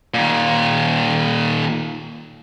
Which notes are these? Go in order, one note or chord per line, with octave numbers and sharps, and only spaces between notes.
A#2 D#3